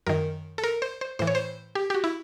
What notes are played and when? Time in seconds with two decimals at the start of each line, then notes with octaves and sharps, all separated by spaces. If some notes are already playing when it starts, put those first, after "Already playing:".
0.07 F#2 D#3 A#4
0.58 A4
0.64 A#4
0.82 C5
1.01 C5
1.19 A2 E3 C5
1.27 C#5
1.35 C5
1.75 G4
1.90 G4
1.94 F#4
2.04 E4